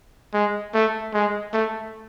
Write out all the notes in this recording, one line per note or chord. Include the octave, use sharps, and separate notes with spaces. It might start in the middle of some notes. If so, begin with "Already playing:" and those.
G#3
A3
G#3
A3